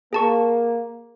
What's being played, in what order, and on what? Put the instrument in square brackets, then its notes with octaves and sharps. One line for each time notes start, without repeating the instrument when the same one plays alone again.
[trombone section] A#3 [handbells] G#4 A5 C#6